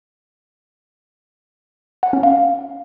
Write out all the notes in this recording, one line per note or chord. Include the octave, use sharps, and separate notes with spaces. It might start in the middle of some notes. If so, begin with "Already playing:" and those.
F#5
C#4
F5